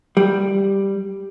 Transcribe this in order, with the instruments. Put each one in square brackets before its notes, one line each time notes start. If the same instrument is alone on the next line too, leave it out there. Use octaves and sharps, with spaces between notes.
[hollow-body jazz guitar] G3